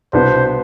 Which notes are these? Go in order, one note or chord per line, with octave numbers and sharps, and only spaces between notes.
C2 B2 B3 D4 C5